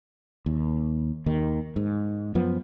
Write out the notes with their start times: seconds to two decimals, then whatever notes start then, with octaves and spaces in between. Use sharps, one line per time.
0.46 D#2
1.26 D#2 D#3
1.76 G#2
2.35 F#2 F3 B3